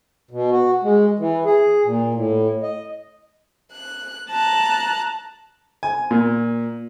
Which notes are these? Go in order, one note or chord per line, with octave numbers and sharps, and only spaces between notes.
B2
F#4
G#3
E3
G#4
A#2
A2
D#5
F#6
A5 A#5 F#6
G#5
A#2